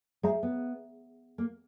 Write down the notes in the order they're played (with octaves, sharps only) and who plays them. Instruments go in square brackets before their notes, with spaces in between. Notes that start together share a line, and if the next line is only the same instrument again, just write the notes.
[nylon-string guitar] G#3 [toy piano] G#4 C#5 E5 A#5
[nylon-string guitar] B3
A#3